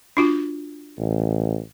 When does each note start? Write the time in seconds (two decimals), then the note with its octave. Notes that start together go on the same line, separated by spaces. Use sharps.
0.17 D4 F4 F#4
0.98 A1